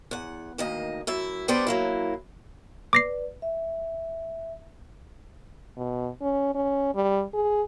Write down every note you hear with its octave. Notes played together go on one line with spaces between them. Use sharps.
E2 F#5
D2 D#3 A#3 D#5
F#2 E4 E5
G3 B3 D4 G4 C5 D5
F#3 A#3 E4
B4 D5 D6 A#6 C7
E5
B2
C#4
C#4
G3
G#4